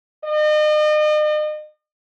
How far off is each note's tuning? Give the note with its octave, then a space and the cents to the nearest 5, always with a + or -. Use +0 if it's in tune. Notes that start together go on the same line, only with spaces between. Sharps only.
D#5 -40